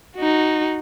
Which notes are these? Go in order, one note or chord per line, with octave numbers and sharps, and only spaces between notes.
D#4 F#4